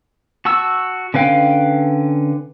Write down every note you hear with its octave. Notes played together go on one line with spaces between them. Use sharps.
F#4 A5 C#6 E6
D3 C#4 B4 F5 G5